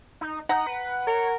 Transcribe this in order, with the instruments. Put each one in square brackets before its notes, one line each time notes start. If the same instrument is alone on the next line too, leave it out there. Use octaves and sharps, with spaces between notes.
[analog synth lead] D#4
[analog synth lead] D#4 [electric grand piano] F#5 [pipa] A#5
[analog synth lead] B4
[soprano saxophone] A#4 [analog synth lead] C#5